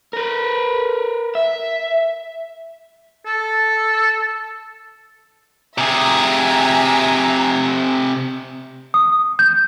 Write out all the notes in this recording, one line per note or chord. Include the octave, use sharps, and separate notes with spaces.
A#4 B4
E5
A4
C3 G#4 E5 G#5 A#5
D#6
G6